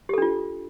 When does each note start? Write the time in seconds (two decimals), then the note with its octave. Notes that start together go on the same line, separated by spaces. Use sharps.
0.09 G4
0.13 A4
0.18 D4
0.22 F4